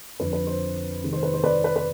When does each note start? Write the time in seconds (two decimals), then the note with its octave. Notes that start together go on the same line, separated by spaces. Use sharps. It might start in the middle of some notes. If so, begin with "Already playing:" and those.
0.19 F2 D3 F3 B4
0.33 B4
0.47 C5
1.03 C3 D#3 G#3 C4
1.13 C5
1.23 B4
1.33 C5
1.44 B4 D5
1.64 B4
1.76 B4